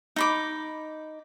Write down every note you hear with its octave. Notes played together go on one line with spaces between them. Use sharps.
D#4 B5 D6